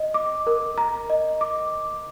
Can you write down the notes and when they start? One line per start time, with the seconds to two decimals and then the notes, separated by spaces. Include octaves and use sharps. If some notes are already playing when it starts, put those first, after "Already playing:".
Already playing: D#5
0.14 D6
0.47 A#4
0.78 A#5
1.10 D#5
1.41 D6